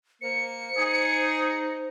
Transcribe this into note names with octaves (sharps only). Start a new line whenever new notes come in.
A#3 C5 C#7
D#4 G#4